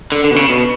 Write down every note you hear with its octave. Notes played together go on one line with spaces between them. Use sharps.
D3
D3
B2
C#3
B2